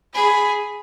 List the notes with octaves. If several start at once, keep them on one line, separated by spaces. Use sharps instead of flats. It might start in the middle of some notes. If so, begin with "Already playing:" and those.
G#4 B5